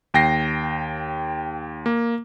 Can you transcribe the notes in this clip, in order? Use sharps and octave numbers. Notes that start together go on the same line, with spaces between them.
D#2 G5 A#6 C7
A#3